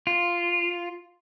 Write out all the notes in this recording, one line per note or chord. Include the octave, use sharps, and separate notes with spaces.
F4